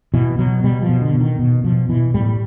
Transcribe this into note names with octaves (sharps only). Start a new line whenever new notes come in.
B2 E3
B2 F#3
B2 G3
F3
B2
D3
B2
D#3
B2
B2 F3
B2 E3
A2 G3